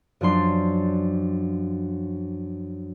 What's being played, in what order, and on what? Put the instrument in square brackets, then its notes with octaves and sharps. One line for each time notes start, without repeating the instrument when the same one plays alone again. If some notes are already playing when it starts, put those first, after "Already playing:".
[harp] F#2 F3 F#3 D4 C6